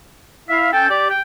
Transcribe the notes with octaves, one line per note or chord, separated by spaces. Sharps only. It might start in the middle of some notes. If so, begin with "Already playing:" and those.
E4 E5 F5
C#4 A4 G5
G4 D5
G5